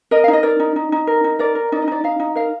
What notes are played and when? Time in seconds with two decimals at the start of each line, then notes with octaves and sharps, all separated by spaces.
0.11 A#4 D#5
0.24 F5
0.28 D#4
0.33 D#5
0.43 A#4 D5
0.60 D#4
0.76 D#4
0.92 D#4
1.07 A#4
1.24 D#4
1.39 A#4 D5
1.55 A#4
1.72 D#4 D5
1.82 D#5
1.88 D#4 D5
2.04 D#4 F5
2.20 D#4
2.35 A#4 F5